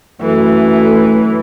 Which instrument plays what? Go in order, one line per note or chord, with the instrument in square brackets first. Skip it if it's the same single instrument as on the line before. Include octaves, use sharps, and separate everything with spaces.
[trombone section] F#2 F#3 A3 [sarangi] E3